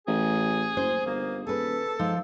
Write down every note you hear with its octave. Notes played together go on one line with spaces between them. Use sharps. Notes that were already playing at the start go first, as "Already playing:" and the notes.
A1 G#4
F#1 C5
G1 A#3
D#1 G#4 A4 B4
G#2 F3